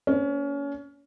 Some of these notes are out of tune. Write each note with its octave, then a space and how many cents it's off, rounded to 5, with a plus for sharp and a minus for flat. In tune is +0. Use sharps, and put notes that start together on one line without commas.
A#3 +0 C#4 +30 C5 +0